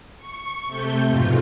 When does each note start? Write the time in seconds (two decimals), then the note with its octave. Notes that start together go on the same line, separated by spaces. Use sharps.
0.17 C#6
0.66 C3 A3 G6
1.08 F2 G#2 B2 F4